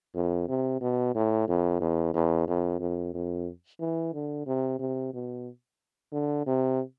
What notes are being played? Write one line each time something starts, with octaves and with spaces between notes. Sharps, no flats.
F2
C3
B2
A2
F2
E2
E2
F2
F2
F2
E3
D3
C3
C3
B2
D3
C3